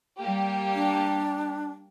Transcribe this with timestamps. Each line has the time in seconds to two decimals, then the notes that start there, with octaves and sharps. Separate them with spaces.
0.19 G3 A#3 G4
0.74 D4